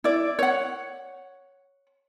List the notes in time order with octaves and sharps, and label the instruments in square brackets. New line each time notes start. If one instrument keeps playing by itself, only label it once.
[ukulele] E4 D5
C#5 F#5